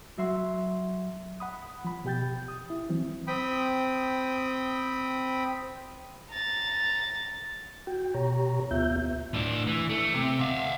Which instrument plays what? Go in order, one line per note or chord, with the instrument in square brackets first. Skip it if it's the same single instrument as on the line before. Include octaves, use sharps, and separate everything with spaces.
[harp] F#3 E5 C6
[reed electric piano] F#5 B5 D#6
F3 B5
B2 G4 G5 G6 A6
D#6
E4
E3 F#3 C4
[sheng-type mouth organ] C4 G5 B5 D#6
[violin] A#5 A6
[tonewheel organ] F#4 G5
B2 G4 C#5 A#5
D2 B3 F4 E5 G6
[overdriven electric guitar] A2 D4
E3
A3
C3
E5 F5